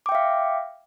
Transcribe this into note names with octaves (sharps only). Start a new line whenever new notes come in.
E5 F5 G5 D6